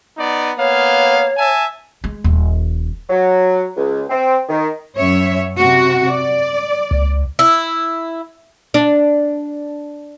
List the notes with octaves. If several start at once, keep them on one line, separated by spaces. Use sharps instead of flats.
B3 D#4 D5
A#3 B3 C#5 F5
E5 G#5 A5
G#3
D#1
F#3
C#2
C4
D#3
F#2 C#5 E5
C3 F#4
D5
C#2
E4
D4